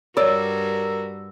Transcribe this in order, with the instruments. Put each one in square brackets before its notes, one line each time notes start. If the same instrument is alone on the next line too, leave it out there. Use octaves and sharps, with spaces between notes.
[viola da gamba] G2 G3 F#4 [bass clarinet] A#4 [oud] C#5 D5 [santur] E6